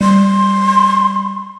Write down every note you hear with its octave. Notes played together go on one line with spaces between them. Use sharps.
G3 C6